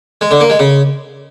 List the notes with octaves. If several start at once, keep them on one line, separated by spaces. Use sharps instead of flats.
G#3
D3
A#3
G#3
C#3